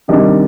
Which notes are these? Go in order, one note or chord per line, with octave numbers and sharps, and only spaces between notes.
C3 D#3 G3 D4